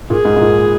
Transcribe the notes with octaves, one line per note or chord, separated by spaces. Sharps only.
A#2 G#4
G#2
G#2
A#2